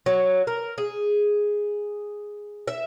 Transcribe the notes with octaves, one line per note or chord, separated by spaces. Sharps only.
F#3
A#4
G#4
E5